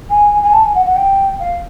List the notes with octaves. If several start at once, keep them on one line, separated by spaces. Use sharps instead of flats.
G#5
G#5
A5
G#5
F#5
F#5
G5
F5